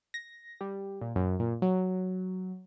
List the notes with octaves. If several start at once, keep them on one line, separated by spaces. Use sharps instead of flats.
A#6
G3
A#2
F#2
A#2
F#3